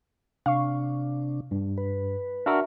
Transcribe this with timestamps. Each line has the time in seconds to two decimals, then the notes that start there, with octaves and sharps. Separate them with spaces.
0.46 C3 D4 F5 C#6
1.51 G2
1.78 B4
2.46 D4 F#4 A#4 E5 A#5